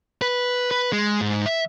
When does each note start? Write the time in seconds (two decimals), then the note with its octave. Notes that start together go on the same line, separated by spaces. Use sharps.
0.22 B4
0.71 B4
0.92 G#3
1.21 G#2
1.46 E5